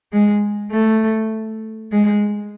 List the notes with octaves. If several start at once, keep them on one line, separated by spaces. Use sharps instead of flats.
G#3
A3
G#3